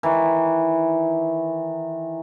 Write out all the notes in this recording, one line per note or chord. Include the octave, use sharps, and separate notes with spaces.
D#3 E3